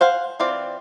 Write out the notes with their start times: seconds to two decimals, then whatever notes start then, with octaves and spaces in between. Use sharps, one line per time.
0.01 C5 F5 F#5 G#5
0.40 E3 C4 F4 D5